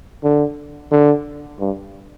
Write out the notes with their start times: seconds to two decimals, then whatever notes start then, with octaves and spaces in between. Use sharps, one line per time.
0.24 D3
0.91 D3
1.60 G2